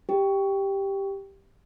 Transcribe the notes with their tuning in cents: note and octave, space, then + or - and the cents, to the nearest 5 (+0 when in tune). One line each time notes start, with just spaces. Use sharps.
G4 +0